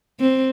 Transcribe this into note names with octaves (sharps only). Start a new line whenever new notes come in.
C4